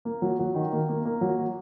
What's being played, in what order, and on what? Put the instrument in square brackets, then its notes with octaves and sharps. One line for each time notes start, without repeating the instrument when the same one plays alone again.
[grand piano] A#3
F#3
F#3
D#3
A#3
A#3
A#3
F#3